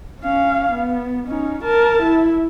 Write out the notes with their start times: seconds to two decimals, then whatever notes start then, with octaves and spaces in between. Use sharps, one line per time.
0.21 C#4 F5
0.72 B3
1.28 C#4 D#4
1.64 A#4 A5
2.02 E4